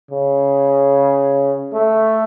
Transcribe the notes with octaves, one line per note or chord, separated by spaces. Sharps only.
C#3
A3